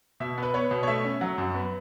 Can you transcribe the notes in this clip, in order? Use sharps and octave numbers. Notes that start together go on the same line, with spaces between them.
B2 E5
B3 B4
B3 C#5
B2
C#5
A3 E5
C#4
F#3 F#5
F#2
B3